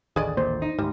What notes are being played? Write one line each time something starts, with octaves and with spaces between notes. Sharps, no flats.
A1 D#2 D3 G#4 D5 D#5
A#2 C5
D#4
D2 G#2 G3